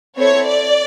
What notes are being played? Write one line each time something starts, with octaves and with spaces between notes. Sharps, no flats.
C4 E4 A4 C#5
D5